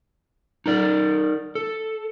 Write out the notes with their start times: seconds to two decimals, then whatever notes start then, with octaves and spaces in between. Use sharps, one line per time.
0.66 D#4 A#4 D5
1.55 A4